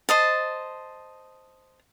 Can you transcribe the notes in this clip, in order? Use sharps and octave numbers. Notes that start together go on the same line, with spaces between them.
C5 D#5 A5